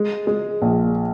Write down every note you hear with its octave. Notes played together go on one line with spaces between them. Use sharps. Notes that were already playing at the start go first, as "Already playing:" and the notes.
Already playing: G#3
G#3
A#1